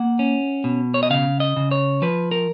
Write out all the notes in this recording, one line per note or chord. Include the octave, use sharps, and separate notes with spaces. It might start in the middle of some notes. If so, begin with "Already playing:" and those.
Already playing: A#3 F#5
C#4
B2
C#5
D#5
C#3 F5
D#5
C#3
C#5
F3 B4
A#4